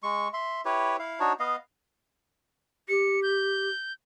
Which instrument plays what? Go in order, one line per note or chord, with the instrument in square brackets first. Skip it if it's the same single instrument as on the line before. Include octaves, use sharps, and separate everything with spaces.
[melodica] G#3 C#6
E5 C6
E4 G4 B4 C#5
E4 F5
D4 D#4 F#4 C#5
B3 D#5 F5
[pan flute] G4 [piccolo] C#7
[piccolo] G6